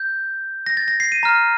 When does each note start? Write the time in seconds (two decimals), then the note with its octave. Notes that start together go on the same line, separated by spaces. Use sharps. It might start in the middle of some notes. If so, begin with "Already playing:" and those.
Already playing: G6
0.66 A#6
0.77 A6
0.88 A#6
1.00 C7
1.12 D#7
1.23 A#5 F6